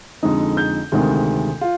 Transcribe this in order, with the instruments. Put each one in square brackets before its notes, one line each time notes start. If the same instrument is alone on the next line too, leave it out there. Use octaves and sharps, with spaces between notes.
[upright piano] F2 D3 G#3 D#4
G6
D2 C3 D#3 G#3
F4